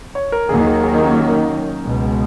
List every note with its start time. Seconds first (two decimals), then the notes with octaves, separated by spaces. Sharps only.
0.15 C#5
0.32 A#4
0.49 D#2 D#3 F#3 A#3 G#4
0.66 G#4
0.82 G#4
0.94 D#4
1.05 C#4
1.15 C#4
1.32 D#4
1.83 C#2 B2 G#3